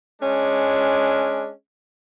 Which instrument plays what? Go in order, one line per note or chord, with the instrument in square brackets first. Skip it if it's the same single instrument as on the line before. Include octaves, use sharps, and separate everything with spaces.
[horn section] G#3 C#4 D4